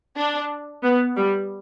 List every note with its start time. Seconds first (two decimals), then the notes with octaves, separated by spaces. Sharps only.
0.17 D4
0.83 B3
1.17 G3